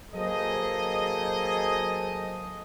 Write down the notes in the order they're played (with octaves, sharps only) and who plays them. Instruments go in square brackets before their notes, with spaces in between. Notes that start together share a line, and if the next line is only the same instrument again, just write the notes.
[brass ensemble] F#3 A#3 G#4 A4 C5 D#5